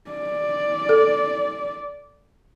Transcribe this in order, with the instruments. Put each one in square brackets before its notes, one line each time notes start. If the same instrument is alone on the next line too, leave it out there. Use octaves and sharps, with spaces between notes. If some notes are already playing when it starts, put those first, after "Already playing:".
[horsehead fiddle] D5
[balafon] A4